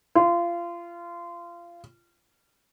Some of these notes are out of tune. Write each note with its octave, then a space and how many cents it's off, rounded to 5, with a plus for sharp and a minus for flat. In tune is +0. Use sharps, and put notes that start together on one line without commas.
F4 -25